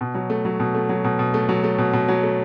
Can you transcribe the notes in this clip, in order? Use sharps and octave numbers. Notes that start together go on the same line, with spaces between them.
B2
F#3
A3
F#3
B2
A3
F#3
B2
B2
A3
F#3
A3
B2
B2
F#3
A3